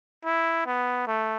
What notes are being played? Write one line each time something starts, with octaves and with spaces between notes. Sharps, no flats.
E4
B3
A3